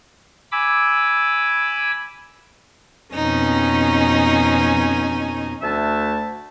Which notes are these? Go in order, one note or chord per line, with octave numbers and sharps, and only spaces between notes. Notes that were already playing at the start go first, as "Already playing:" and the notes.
G#5 B5 D6 E6
F2 B2 C#4 D#4 G#5
D2 A3 D4 E5 A5